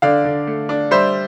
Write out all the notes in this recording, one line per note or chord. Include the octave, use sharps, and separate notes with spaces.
D3 D5 F5
D3
A3
D4
G3 C5 E5